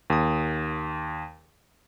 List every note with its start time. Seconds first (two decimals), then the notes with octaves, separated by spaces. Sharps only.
0.10 D#2 D#6